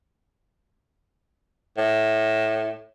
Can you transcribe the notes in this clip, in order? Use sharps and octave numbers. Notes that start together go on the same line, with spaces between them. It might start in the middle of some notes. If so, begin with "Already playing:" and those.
A2